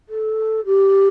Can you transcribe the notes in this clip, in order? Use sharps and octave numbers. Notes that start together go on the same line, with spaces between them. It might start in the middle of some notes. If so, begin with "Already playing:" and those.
A4
G4